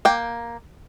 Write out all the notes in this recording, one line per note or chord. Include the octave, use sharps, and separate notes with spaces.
A#3 G5